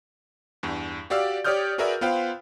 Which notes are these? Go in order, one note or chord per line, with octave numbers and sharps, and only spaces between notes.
E2 G2
F#4 G4 D5 F5 E6
G4 C#5 D5 D#6 F6 G6
F#4 G#4 A#4 B4 D5 E5
B3 F4 B4 C5 F5 G5